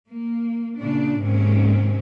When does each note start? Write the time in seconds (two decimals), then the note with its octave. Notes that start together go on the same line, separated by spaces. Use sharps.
0.10 A#3
0.79 A#2 C#3 D4
1.20 G#2 C3 D#3 A#3 C4 C#4